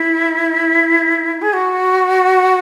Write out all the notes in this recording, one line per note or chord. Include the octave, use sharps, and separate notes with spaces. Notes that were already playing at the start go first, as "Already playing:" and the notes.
Already playing: E4
G#4
F#4